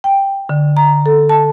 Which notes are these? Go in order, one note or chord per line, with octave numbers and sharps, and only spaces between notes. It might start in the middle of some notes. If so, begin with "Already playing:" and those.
G5
D3
A#5
A4
A5